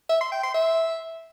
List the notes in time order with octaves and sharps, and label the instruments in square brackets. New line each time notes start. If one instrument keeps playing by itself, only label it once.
[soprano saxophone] E5
C6
G5
C6
E5